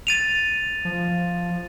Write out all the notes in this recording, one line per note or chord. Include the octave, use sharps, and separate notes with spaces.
A6 D#7 F7
F3